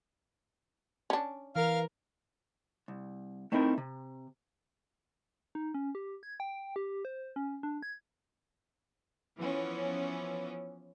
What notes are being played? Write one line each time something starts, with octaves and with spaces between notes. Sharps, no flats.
C#4 D4
E3 A#4 F5 F6
C2
A3 C4 D#4 E4 A#4
C3
D#4
C#4
G4
G#6
G5
G4
C5
C#4
D4
G#6
E3 F3 B3 C#4